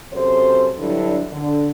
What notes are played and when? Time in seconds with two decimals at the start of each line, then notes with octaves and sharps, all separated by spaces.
0.12 F#2 C3 A4 C5
0.78 G2 D3 F#3 D4 E4
1.31 D3